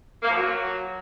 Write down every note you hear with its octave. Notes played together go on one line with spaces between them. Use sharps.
A#3
F3
F#3